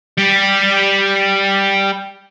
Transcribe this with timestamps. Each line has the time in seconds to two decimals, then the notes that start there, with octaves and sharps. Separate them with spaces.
0.18 G3 G4